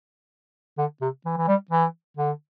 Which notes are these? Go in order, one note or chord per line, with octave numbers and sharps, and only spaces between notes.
D3
C3
E3
E3
G3
E3
D3